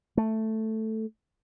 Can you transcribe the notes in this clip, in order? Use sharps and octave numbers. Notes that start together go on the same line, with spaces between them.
A3